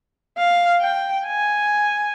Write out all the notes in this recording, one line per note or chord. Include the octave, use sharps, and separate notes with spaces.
F5
G5
G#5